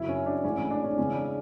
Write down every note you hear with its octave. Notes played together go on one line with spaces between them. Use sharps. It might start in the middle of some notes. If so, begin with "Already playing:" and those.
Already playing: F#2 C#3 F#3 E4
C#4
D4
A1 A2 G#3 C#4
C#4
D4
C#4
E2 C#3 G#3 C#4
D4